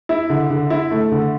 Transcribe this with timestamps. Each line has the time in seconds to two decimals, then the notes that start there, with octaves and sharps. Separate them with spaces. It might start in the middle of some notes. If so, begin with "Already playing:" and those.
0.09 E4
0.30 D3
0.50 D3
0.70 E4
0.91 A3
1.12 D3